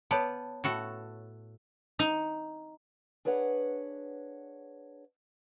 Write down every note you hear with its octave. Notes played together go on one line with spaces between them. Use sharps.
B3 B4 C#5 D5 A5
A2 F#4 A4
D#4
D4 G#4 B4 C#5 F#5